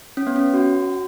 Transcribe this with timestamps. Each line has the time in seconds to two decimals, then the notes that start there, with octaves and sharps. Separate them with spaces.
0.17 C#4
0.27 B3
0.36 C#4
0.54 F#4